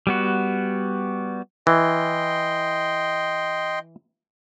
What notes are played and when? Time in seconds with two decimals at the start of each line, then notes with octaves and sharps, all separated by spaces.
0.07 G3 B3 F#4
1.67 E3 D#5 G5 C6